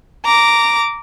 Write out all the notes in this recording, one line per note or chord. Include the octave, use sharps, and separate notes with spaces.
A#5 D6